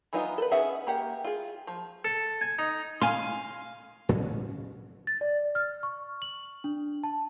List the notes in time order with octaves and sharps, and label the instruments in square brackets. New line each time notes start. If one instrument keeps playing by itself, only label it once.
[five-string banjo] E3 F#3 B3 D#4 F4
A4 B4
B3 C#4 G#4 E5 F#5
A#3 G4 F#5
F4 G#4
F3
[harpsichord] A4
G#5
D#4
[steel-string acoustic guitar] F5 [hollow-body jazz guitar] G#5 C6
[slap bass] A2 C#3 F#3 C#4
[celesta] A6
D5
F6
C#6
F#7
D4
A5